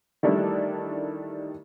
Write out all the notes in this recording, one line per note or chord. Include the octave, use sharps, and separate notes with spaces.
D#3 E3 G3 A3 D4 E4